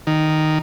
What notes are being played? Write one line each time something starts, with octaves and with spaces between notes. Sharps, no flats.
D#3